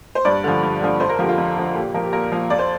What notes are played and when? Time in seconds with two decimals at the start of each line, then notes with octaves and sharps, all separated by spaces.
0.15 C5
0.25 G2 D5
0.44 D3 F3
0.63 G2
0.81 D3 F3
1.00 F2 C5
1.09 A#4
1.19 D3 F3 G4
1.28 F4
1.38 F2
1.56 D3 F3
1.75 A#2 G4
1.94 F3 A#4
2.03 G4
2.13 A#2 A#4
2.32 F3 F5
2.50 F2 D5
2.59 C5